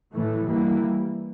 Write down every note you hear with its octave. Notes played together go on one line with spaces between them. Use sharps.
A2 E3 A3
E3 G3 A#3